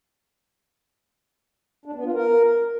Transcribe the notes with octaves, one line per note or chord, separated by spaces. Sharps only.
D4
B3
F4
A#4